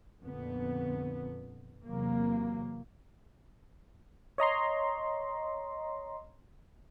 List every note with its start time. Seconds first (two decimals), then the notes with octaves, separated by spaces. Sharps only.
0.23 F2 A#2 D3 B3
1.85 E2 C3 F#3 A#3
4.38 C#5 D#5 A#5 C6